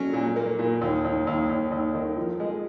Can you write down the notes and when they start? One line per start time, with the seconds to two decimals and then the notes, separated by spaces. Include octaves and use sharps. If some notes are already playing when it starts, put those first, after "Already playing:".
Already playing: F#3 C#4
0.13 A#2
0.36 A#3
0.59 A#2
0.81 D#2
1.04 D#2
1.27 D#2
1.49 D#2
1.71 D#2
1.94 D#3
2.17 F3
2.40 G#3